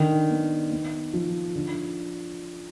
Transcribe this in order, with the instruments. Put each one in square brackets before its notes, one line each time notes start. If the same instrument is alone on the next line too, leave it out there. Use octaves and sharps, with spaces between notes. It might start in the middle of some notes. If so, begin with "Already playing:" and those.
Already playing: [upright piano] D3 [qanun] D#3
[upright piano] B3
B3
F3
D3